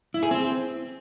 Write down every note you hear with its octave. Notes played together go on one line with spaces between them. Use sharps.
E4
G#4
C4